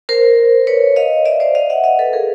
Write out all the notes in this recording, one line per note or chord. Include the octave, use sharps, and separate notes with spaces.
A#4 C5
B4 C#5
D#5 F5
D5 E5
C5 D5
D#5 F5
E5 F#5
D#5 F5
A4 B4
G#4 A#4